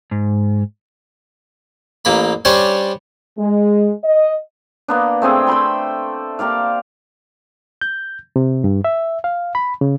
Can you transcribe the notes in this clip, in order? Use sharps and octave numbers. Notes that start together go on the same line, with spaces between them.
G#2
A1 A#3 B5
G3 C#4 D4 C5 C#5
G#3
D#5
A#3 B3 D4
A3 C4 G#4 G5
C5 G5 B5 C6
A#3 G4 D5 F5
G6
C3
G2
E5
F5
B5
C#3